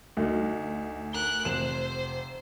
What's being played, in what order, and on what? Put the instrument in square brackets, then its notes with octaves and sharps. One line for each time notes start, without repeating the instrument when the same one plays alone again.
[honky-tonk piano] D2 [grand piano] D#4
[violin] A#4 F#6 [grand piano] G7
[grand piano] F1 [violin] C5 [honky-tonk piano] E7